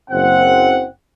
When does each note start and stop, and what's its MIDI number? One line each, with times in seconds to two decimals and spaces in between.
0.10 0.86 30
0.10 0.86 60
0.10 0.86 78